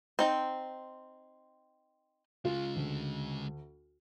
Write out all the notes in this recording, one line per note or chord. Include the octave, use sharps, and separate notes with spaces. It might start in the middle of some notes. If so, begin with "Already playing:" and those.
C4 D#4 G5
C#3 G#3 F4
D2